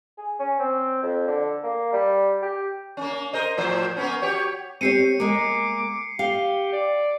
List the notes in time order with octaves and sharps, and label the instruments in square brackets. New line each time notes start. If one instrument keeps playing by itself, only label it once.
[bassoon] G#4
C#4
C4
F2
D3
A#3
G3
G4
[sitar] A#3 C#4
A#4 C5 D#5
A2 F3 C5
A#3 B3 C#4
F#4 G4 C#5
[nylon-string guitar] C4 G4 C#5 [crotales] C7 C#7 D#7
[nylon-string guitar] G#3 A#3 [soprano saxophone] D6
[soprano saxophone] G4 [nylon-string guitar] F5
[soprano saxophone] D5